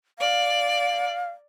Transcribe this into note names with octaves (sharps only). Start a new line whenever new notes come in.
D5 F5